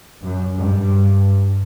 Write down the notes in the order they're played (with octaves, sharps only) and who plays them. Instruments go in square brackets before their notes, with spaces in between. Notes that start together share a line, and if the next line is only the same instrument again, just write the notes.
[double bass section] F#2
G2